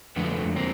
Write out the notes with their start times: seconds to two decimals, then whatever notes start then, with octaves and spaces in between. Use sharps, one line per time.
0.16 F2 D3 A3 B3
0.56 A#3 C4